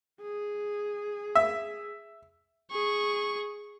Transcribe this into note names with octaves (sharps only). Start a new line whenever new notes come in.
G#4
E5
G#4 C#6